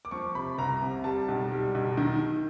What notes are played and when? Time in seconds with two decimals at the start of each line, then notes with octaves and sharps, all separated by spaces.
0.05 D6
0.11 F3 C#6
0.35 C3 B5
0.58 C2 A#5
0.82 C3
1.04 G3 A5
1.28 B1
1.52 G3
1.75 B1
1.97 D#3